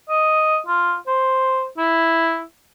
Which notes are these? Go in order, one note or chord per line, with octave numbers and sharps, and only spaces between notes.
D#5
F4
C5
E4